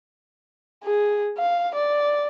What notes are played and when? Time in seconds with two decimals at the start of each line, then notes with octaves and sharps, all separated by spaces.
0.84 G#4
1.38 F5
1.75 D5